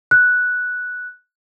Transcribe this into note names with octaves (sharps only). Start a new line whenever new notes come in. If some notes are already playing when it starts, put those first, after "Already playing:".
F#6